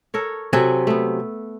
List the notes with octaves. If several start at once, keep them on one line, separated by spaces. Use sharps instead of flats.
A4 A#4 C#5
C3 F#3 G#4 A4
A3 B3